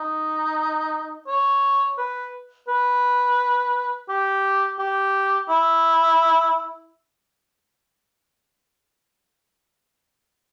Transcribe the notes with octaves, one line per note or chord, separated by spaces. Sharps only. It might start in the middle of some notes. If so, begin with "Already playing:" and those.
Already playing: D#4
C#5
B4
B4
G4
G4
E4